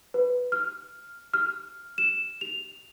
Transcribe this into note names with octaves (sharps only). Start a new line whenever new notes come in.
B4
F6
F6
E7
F7